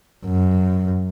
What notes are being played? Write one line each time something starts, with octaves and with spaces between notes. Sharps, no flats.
F#2